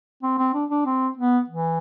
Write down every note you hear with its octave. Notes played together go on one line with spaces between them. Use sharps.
C4
C4
D4
D4
C4
B3
E3